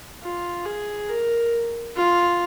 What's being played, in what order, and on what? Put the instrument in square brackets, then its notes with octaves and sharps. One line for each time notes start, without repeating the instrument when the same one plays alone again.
[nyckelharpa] F4
G#4
A#4
F4